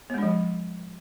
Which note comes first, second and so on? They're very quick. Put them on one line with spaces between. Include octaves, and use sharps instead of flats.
B3 G#3 D4 F3